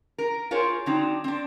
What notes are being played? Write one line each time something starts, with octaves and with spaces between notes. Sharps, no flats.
A#4
F4 G#4 A#4 C5 C#5
D3 F#3 C4 D4 D#4
C4 D4